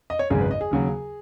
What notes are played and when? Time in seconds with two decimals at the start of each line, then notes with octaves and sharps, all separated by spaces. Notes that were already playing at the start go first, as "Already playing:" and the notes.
0.10 D#5
0.19 C#5
0.30 G#1 F#2 C#3 G#3 G#4
0.41 B4
0.51 D#5
0.61 G#4
0.71 D#2 C#3 F#3